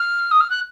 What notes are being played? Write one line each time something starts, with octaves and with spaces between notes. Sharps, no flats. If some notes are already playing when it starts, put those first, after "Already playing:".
Already playing: F6
D#6
F6
F#6